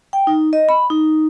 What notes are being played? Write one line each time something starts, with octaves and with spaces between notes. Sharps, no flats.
G5
D#4
D#5
B5
D#4